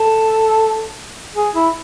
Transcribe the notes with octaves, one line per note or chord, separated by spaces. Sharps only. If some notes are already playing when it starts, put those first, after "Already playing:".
Already playing: A4
G#4
E4